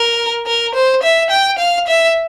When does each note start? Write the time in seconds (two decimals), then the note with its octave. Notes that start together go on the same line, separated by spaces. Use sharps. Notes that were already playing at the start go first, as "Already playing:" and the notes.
Already playing: A#4
0.46 A#4
0.75 C5
1.03 E5
1.31 G5
1.59 F5
1.87 E5